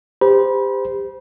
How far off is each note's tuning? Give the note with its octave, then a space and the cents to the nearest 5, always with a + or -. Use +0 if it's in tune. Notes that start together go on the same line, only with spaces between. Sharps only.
G4 +25 C5 -25 B5 -35